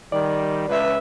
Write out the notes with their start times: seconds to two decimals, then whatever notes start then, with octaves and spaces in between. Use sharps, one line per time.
0.12 D#3 G3 D5
0.69 C#2 B4 E5